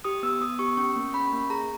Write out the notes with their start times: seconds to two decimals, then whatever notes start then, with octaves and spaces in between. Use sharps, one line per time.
0.04 G4 D#6
0.23 B3 E6
0.41 B3 D#6
0.59 G4 C#6
0.77 C#4 C#6
0.96 A#3
1.13 C#4 B5
1.33 A#3
1.50 G#4 A#5